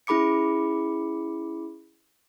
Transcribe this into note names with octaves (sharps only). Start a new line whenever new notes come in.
C#4 E4 G#4 B5 D6 C#7